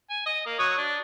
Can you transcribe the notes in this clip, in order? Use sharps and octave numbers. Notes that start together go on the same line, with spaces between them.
G#5
D#5
A#3
F#3 C#5 D#6
D4